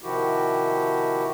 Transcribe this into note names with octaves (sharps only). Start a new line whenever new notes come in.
C3 D#3 F3 E4 F#4 G4